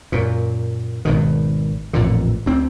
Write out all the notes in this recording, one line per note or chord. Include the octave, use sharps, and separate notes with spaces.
F#2 A#2
G#1 B2 D#3
A1 F2 A#2 D3
D2 C4